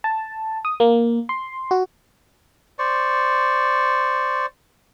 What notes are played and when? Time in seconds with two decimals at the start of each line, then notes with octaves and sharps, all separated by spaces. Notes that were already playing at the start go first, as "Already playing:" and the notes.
0.04 A5
0.65 D#6
0.80 A#3
1.29 C6
1.71 F#4
2.79 C5 D5 C#6